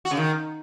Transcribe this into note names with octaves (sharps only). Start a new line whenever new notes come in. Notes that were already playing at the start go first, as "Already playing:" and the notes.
F#4
C#3
D#3